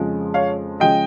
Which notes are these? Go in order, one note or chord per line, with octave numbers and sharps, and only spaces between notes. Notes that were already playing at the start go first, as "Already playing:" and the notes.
Already playing: F2 C#3 F3 G#3
C#5 F5
C#3 F3 G#3 D#5 G5